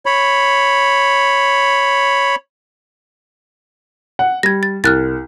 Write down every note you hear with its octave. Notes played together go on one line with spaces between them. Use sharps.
C#5 B5
F#5
G3 G#6 A#6
A6
C2 F6 F#6 A6